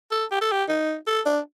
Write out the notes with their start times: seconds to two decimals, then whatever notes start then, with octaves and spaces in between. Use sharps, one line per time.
0.12 A4
0.31 G4
0.41 A4
0.52 G4
0.69 D#4
1.07 A4
1.26 D4